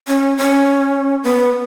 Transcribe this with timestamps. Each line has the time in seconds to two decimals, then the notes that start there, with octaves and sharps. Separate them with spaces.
0.08 C#4
0.37 C#4
1.24 B3